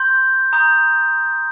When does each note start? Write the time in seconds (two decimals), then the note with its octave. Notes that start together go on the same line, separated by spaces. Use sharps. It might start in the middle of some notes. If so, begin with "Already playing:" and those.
Already playing: C6 G6
0.53 A#5 D#6 G6